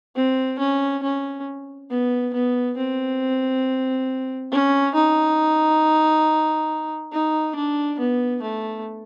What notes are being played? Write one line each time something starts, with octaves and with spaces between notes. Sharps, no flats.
C4
C#4
C#4
B3
B3
C4
C#4
D#4
D#4
D4
B3
A3